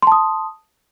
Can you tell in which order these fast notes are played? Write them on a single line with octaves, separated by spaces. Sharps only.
C6 A5 D#6